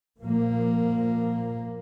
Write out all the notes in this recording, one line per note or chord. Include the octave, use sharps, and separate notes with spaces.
A#2 F3 A#3